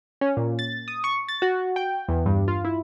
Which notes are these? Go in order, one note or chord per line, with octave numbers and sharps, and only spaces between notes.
C#4
A#2
A6
D#6
C#6
A6
F#4
G5
E2
G2
F4
E4